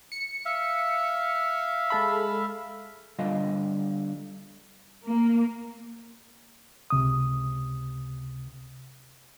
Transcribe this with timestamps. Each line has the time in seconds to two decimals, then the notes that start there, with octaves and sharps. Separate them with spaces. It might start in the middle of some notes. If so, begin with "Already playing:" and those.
0.12 C#7
0.45 E5 F5
1.90 G#3 A4 B5
3.19 D3 G3 F4 D#5 F5
5.07 A#3
6.90 C#2 C3 D#6